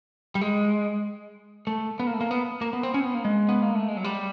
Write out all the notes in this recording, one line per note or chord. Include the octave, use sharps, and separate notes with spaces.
G3
G#3
A3
B3
A#3
A3
A#3
B3
A#3
B3
C4
C#4
C4
B3
A#3
G#3
B3
A#3
A3
G#3
F#3
G3